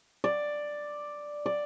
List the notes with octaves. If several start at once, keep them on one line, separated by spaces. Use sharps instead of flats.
D5
D5